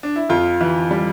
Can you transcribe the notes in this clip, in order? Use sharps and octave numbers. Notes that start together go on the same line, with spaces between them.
D4
E4
F2 F4
E3
G3